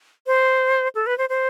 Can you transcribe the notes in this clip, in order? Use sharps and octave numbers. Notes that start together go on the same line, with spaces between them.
C5
A4
B4
C5
C5